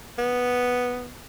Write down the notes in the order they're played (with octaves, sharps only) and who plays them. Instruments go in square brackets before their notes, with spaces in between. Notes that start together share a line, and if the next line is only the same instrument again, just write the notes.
[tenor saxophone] B3